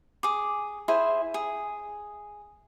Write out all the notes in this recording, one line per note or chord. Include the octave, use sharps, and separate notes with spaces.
G#4 D6
E4 G#4 C5
G#4